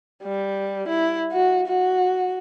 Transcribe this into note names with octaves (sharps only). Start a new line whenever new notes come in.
G3
E4
F#4
F#4